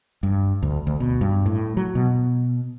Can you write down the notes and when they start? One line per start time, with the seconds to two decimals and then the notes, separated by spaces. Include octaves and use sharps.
0.23 G2
0.62 D2
0.87 D2
1.00 B2
1.21 G2
1.46 A2
1.77 F#3
1.95 B2